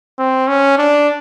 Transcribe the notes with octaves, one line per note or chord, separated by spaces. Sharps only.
C4
C#4
D4